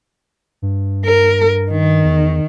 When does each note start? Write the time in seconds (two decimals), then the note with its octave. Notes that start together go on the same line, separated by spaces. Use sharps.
0.62 G2
1.05 A#4
1.70 D#3
2.04 E2